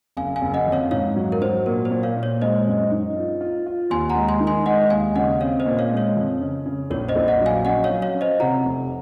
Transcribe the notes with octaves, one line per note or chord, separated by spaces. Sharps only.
F#1 F5 G#5
F5 G#5
F#1
D#5 F#5
F2
C#5 F5
G#2 C#5 F5
F#3
A#4
F#3 C5
A#2 A#4
C5
A#2
C#5 F5
A#2
C#5
G#3 C5 D#5
F#2
D#4
F4
F4
F4
D#2 G#5 C6
F#5 A#5
G#3
G#5 C6
D#3
G#5 C6
G#3 D#5 F#5
D#2 F5 G#5
C#3 D#5 F#5
C4 C#5 F5
C5 D#5
A#2
C#5 F5
G#3
C#5 F5
F2
C#3
C#3
A#1 C#5
C5 D#5
A#1
D#5 F#5
F#3
F5 G#5
C#4 D#5 F#5
C#5 F5
F#3
C#5 F5
C#4
C5 D#5
C3 F#5 A#5
F1